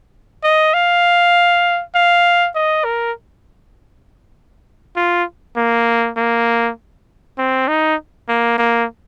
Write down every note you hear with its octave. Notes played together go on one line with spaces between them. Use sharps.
D#5
F5
F5
D#5
A#4
F4
A#3
A#3
C4
D#4
A#3
A#3